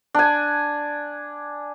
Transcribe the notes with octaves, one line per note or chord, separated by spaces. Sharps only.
D4 G#5